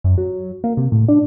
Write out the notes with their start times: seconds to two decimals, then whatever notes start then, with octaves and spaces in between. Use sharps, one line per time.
0.04 F#2
0.18 F#3
0.64 A#3
0.77 C3
0.92 A2
1.08 D4